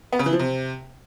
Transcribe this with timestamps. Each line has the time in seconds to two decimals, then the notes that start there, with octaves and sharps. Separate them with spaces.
0.13 B3
0.19 C#3
0.26 E3
0.33 F3
0.39 C3